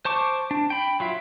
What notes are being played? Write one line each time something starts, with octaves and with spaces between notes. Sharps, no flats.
C5 A5 C#6 D6
D4
G5 B5
F#3 F4 E5